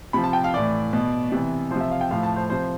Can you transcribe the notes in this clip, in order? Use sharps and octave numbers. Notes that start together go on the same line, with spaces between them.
C3 F3 B5
A5
G5
F5
A2 E3 D5
B2
C3 E3
F3 C5
C3 E5
F5
G5
A2 F3 F5
A5
C5
C3 F3 C5